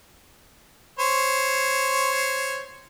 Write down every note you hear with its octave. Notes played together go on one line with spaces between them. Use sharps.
C5 C#5